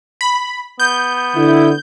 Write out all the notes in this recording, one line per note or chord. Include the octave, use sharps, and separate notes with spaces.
B5
B3 G6
D3 E4